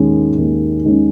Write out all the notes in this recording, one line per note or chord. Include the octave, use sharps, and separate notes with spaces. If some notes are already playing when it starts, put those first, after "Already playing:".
Already playing: D#2 D#3 G#3 C#4
D#2
D#3 G#3 C#4